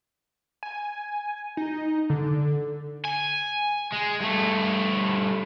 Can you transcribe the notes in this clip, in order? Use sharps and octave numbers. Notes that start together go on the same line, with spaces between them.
G#5
D#4
D3
G#5
G#3
G2 A3